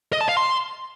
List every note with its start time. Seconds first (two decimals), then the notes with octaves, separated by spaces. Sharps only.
0.13 D#5
0.21 A5
0.29 F5
0.37 C6